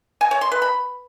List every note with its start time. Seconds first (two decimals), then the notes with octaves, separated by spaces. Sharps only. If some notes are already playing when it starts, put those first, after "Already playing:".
0.21 G#5
0.31 C#5
0.41 C6
0.52 B4
0.62 B5